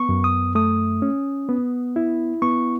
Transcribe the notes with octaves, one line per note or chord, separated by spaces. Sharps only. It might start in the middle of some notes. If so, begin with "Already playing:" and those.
Already playing: B3 C#6
F#2
D#6
A3 D#6
C#4
B3
E4
B3 C#6